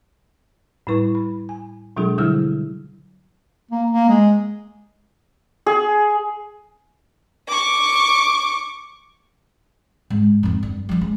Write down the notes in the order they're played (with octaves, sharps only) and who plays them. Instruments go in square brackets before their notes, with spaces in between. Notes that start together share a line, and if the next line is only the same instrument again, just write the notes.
[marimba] A2 G3 E4 B4 C#6
B5
G#5
B2 F#3 G#3 D4 F4 G#4
D3 F#3 G3 E4 E6 F6
[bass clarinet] A#3
A#3
G#3
[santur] G#4
[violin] C#6 D6
[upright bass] G#2
F2 D#3
G2
F3 G3
G#3